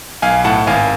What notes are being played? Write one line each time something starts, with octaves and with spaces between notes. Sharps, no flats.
B1 F5 G#5
A2 F#5 A5
G#1 F5 G#5